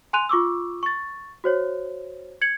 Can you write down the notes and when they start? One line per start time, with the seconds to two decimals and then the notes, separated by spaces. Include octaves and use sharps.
0.13 G#5 C6 F#6 D#7 F7
0.29 F4 C#6 D6 E6
0.83 C#6 A6
1.44 F#4 C5 C#5
2.41 G#6 C#7 F#7